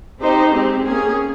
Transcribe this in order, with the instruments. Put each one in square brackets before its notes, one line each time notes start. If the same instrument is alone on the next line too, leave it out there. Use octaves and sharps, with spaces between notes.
[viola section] C4 D#4 G4 C5
G#3 C4 G4
A#3 C#4 G#4